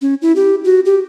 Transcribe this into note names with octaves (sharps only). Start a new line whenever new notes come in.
C#4
E4
G4
F#4
G4